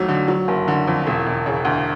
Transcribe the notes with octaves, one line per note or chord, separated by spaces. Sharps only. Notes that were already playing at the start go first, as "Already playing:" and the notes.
Already playing: F2 D#3 F#3 A3
D3
F#3
F#1
D3
F2
E1
E1
C#3
D2